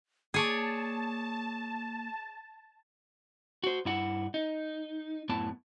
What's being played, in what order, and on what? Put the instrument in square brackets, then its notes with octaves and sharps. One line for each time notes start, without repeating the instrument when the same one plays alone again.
[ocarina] A#3 [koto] G#4 C#5 D5 [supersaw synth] A5
[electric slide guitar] F#4 C5
G2 E4 F#5
D#4
F#2 A2 B3 E4 A5